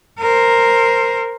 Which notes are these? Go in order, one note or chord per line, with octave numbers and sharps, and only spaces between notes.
A#4 C5